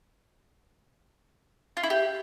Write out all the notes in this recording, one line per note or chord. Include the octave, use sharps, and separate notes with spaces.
F4
E4
G4